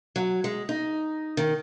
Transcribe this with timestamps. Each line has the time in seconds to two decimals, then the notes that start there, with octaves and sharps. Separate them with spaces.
0.16 F#3
0.44 G#3
0.69 D#4
1.37 D#3